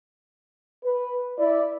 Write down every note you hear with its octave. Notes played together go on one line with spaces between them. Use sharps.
B4
E4 D5